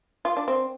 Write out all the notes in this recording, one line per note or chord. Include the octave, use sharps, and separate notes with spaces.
F4
D4
C4